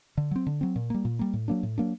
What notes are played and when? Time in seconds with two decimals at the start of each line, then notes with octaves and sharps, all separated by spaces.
0.17 D3
0.31 F#3 C4
0.47 D3
0.61 F#3 C4
0.76 A#2
0.90 G3 A#3
1.05 A#2
1.19 G3 A#3
1.33 A2
1.48 F#3 A#3 D4
1.63 A2
1.78 F#3 A#3 D4